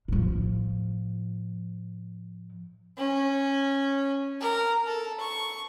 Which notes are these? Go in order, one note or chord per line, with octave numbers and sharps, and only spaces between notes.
A2 F3
C#4
A#4
A4
C#6